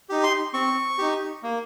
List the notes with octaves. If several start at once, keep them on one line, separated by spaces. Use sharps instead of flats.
D#4 G4
C6
C4 C#6
D#4 G4
A#3